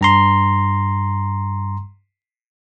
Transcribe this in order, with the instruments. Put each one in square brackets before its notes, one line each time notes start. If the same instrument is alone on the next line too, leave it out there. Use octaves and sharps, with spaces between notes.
[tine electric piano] G2 A#5 C6